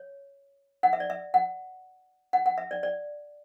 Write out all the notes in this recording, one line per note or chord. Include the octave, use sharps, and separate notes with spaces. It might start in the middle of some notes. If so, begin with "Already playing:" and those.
Already playing: C#5
F#5
E5
D5
E5
F#5
F#5
F#5
E5
D5
D5